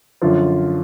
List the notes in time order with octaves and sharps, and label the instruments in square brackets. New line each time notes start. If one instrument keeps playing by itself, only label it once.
[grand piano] F#2 D3 F3 F4